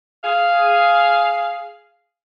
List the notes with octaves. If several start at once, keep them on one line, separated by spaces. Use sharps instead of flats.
G#4 F5